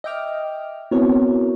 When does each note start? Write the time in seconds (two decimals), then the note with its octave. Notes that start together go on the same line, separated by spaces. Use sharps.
0.04 D#5 E5 G5 D6 F6
0.91 B3 C4 E4 F#4 A#4 C#5